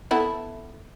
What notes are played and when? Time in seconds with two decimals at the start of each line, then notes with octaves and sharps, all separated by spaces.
0.11 B3 E4 A4